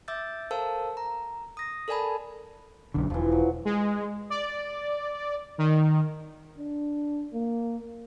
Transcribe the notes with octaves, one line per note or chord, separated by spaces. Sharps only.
E5 D6 E6 G6 A6
A4 A#4 C5 F5 A5 E6
A#5
D#6 A#6
A4 A#4 D5 G#5 A5 B5
B1 F#2 D3
E1 E3 F3
F#3
G#3
D5
D#3
D4
A#3